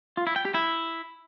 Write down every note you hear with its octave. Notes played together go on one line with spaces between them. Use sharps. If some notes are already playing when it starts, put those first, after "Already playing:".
F4
E4
G5
G4
E4